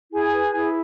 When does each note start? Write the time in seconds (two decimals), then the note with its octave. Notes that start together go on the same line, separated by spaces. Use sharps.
0.12 E4 G#4 G#5
0.32 B4
0.53 E4